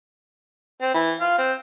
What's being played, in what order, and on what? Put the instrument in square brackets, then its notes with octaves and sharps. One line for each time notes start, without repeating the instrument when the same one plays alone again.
[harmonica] C4
E3
F4
C4